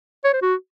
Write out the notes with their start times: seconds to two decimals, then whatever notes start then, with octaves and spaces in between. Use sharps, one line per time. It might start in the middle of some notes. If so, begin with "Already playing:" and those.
0.24 C#5
0.33 C5
0.42 F#4